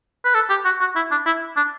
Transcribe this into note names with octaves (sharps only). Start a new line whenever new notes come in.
B4
A4
G4
F#4
F#4
E4
D4
E4
D4